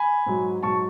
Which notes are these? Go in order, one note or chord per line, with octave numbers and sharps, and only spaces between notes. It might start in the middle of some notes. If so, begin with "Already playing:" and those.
Already playing: G#5 B5
G#2 F#3
G#2 F#3 A5 C#6